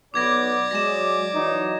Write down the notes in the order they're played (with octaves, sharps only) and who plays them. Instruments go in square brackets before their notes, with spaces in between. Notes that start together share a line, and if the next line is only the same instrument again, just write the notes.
[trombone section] B1 F#3 B3 [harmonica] D5 [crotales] D6 G#6 A#6
[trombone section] F#3 G#3 [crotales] A#6 E7
[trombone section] E3 F#3 D#4